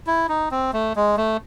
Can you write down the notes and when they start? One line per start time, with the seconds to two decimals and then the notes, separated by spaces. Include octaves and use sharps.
0.07 E4
0.29 D#4
0.51 C4
0.73 A3
0.96 G#3
1.17 A3